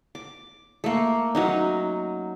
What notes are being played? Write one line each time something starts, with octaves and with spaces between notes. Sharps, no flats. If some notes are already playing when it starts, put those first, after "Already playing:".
D6
A3 A#3
F#3 C#4 D#4